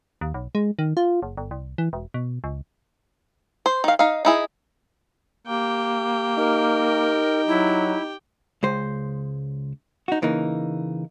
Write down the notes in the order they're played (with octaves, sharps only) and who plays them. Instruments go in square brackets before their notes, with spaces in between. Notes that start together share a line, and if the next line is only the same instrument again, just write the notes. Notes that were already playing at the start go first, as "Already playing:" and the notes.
[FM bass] D#2
B1
G#3
D#3
F4
F#1
G1
C2
E3
E1
B2
C#2
[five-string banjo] C5
D#3 F5
D#4 F5
D#4 E4 G#4
[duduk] A#3 [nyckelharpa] G4 G5
[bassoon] D#4 [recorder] A#4
[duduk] F#3 [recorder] E4
[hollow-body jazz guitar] C#2 G#3 C5
D#4 F#4
C#3 E3 A#3 D#4